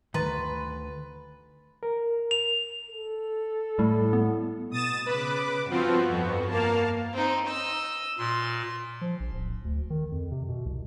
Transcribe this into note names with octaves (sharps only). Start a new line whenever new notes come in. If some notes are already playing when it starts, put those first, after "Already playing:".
D2 G2 D#3 B4 A#5 C6 A6
A#4
F7
A4
A2 G3
B3
B2 D#6 A6 E7
C#3 B4 D6
G2 F3 B3 C4 F4 F#4
F2
A#3 F5 A5
C4 D#4
D#5 E6
A#2 C6
F3
A#1
D1
D2
D#3
F2
C3
B2
C2